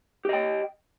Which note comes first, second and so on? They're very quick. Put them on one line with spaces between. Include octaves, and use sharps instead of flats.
G4 D#5 G5